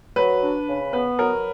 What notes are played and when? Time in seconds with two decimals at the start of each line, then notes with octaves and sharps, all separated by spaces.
0.16 F#3 B4
0.41 D4
0.68 C#3
0.93 B3 B4
1.18 F#3 A#4